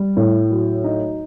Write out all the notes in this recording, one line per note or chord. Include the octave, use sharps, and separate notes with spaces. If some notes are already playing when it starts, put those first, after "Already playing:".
Already playing: G3
A2
F#3
D#4